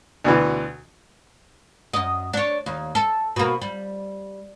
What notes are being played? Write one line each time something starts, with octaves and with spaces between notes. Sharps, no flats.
D2 B2 E3
F#2 D#5
D4 C#5
D#2
A4
B2 A#3
G3